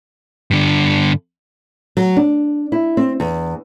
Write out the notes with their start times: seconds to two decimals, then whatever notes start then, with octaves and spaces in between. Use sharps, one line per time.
0.51 G2 D3
1.97 F#3
2.16 D4
2.72 E4
2.97 C4
3.20 E2